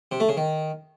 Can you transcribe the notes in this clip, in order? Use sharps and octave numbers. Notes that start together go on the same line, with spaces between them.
C3
A3
C#3
D#3